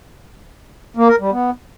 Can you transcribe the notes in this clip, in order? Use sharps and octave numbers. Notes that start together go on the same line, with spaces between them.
A#3
A#4
G3
B3